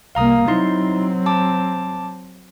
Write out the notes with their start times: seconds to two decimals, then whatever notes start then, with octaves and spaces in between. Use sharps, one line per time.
0.15 C2 A#3 F5 A#5 D#6
0.48 F#3 C4 D#4 E4 C6
1.26 A5 D6